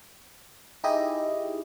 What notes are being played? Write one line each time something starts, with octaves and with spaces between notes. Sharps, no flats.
D#4 E4 G4 G#4 D#5